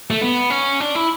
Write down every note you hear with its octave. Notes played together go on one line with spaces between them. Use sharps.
A3
B3
C#4
D4
E4